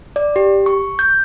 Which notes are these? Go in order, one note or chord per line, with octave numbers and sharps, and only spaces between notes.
D5
G4
C#6
G6